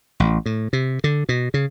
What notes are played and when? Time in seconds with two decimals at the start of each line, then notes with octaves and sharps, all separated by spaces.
0.20 A1
0.46 A2
0.73 C3
1.04 D3
1.29 B2
1.54 C#3